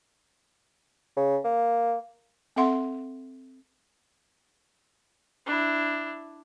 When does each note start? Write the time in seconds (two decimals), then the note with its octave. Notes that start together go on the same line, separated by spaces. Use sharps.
1.17 C#3
1.44 A#3
2.56 C4 A4 E5 F#5 C6
5.46 D4 E4